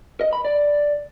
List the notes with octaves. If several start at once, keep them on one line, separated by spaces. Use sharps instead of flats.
D#5
B5
D5